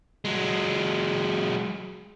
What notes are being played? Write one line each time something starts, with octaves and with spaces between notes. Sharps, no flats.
F#3 G#3